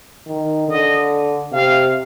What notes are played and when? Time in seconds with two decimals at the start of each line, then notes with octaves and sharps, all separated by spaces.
0.27 D#3
0.69 D3 D#5
1.52 C3 F5